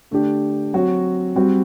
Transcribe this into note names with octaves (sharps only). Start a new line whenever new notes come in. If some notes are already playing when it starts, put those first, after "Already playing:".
D3 A3 D4 G4
F#3 C4 F#4
G3 C4 F#4